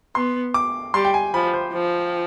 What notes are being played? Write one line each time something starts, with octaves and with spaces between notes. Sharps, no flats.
B3 C6
D6
G3 C6
G5
G#5
F3 B5
C5
F3